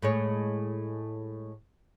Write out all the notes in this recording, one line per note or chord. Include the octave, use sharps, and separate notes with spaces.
A2 G#3 C#5